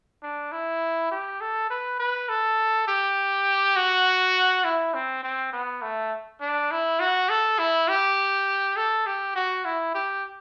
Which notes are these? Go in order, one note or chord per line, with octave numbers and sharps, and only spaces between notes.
D4
E4
G4
A4
B4
B4
A4
G4
F#4
E4
C4
C4
B3
A3
D4
E4
F#4
A4
E4
G4
A4
G4
F#4
E4
G4